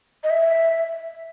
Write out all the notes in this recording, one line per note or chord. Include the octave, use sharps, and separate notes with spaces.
D#5
E5